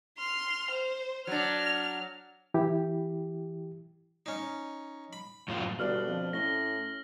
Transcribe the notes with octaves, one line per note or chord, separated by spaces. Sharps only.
C6 F6
C5
F#3 D4 F6
E3 E4 G4
C#4 D#4
B5
F#2 A2 F4
G1 B2 D4 F6 F#7
F2
A2 C#4 A#6 G7